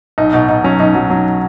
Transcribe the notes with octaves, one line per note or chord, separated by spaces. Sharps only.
B1 D#4
B2 D#4
B2 D#4
F#3 C#4
B1 D#4
F#3
F#3